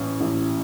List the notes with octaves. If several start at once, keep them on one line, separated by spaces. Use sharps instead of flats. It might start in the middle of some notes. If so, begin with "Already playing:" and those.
Already playing: A1 C#4
A1